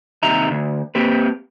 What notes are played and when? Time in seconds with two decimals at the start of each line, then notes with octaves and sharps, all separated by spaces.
0.23 D#2 C3 D#4 E5 A#5
0.51 D2
0.95 A#3 C4 G4 B4